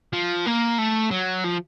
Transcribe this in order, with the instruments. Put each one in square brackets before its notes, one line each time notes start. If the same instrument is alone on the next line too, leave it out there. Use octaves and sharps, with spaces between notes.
[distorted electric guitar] F3
A#3
A3
F#3
F3